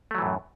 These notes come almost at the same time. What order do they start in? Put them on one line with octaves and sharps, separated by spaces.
A3 F#3 E3 A2 F#2